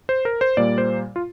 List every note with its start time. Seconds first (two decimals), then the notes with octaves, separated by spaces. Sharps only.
0.09 C5
0.25 A#4
0.41 C5
0.57 A#2 G3 A#3 D5
0.78 C5
1.16 F4